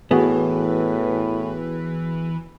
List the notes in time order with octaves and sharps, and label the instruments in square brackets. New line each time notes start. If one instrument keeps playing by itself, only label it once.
[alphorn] A2 [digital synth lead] E3 [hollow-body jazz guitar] B3 [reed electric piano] F#4 G#4